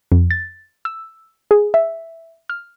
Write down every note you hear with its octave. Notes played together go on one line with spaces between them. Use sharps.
F2
A6
E6
G#4
E5
F6